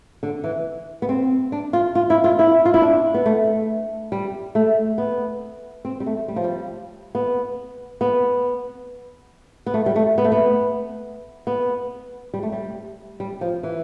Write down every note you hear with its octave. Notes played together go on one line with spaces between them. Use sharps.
D3
E3
B3
C4
D4
F4
F4
E4
F4
E4
F4
E4
D4
B3
A3
G3
A3
B3
C4
G3
A3
G3
F3
G3
B3
B3
B3
A3
G3
A3
B3
A3
B3
B3
G3
A3
G3
G3
F3
E3